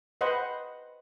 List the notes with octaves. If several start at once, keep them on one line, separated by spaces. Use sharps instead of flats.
B4 C5 D#5 F#5